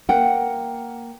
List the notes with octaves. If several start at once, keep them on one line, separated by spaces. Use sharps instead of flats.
A#3 F#5 G5